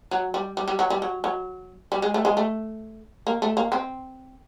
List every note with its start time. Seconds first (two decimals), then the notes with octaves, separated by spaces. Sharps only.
0.11 F#3
0.34 G3
0.57 G3
0.68 G3
0.79 F#3
0.90 G3
1.02 F#3
1.24 F#3
1.92 G3
2.02 G#3
2.14 A3
2.25 G#3
2.37 A3
3.27 A#3
3.42 A3
3.57 A#3
3.72 C4